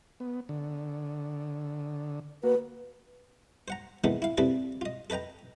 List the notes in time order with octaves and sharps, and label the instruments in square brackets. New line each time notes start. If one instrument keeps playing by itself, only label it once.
[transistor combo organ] B3
D3
[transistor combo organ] A#3 F#4 [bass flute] B4
[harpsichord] C5 F#5 A#5
D#3 E3 G#3 B3 A4
E4 F5
G3 C4 E4 G#4 A4 B4
F4 D#5
A4 B4 D#5 G5 A#5